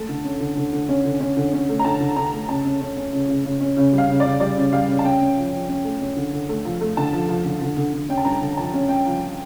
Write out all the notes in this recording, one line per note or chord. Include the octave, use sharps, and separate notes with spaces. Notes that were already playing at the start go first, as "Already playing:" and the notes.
Already playing: A3 A5
D3
C#4
D3
D3
D3
C#4
D3
C#4
D3
C#4
A3
A#5
D3 A5
D3
D3 A#5
A3
C#3 A5
C#4
C#4
C#4
C#3
C#3
C#3
C#4
C#3
G3
F5
C#3
D5
C#3
G3 D5
C#3
G3 F5
C#3
A5
C#4 G5
C#4
F3
F3
C#4
A3
C#4
D3
D3
A3
F3
A3
D3 A5
F3
F3
D3
D3
D3
D3
C#4 G5
A5
G2 A#5
D3
F3 A5
C#4
C#4 G5
F3